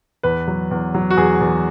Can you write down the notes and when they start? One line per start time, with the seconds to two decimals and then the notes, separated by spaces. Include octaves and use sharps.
0.23 E2 B4
0.48 F#3
0.71 E2
0.94 F#3
1.10 F#4
1.17 E2 G#4
1.41 E2